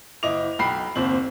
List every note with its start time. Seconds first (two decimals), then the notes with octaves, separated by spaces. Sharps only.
0.23 F#1 E4 D#5 D6 F7
0.59 B1 G5 B5 C7
0.95 F#1 D#2 C4 F#7